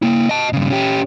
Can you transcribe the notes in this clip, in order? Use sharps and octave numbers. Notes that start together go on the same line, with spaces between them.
A#3 E4
D#5 A5
G2 C#3
C#4 G4